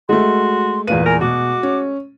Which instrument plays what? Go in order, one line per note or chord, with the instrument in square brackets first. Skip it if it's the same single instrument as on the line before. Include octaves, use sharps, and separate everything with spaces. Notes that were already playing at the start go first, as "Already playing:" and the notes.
[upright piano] G#3 A3 [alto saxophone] F#4 [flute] C6
[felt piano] E2 A#2 D#7 [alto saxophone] B4 [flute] F5
[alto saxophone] A#4 [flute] G#5
[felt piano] B2 [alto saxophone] F#4 [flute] D6
[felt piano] C#4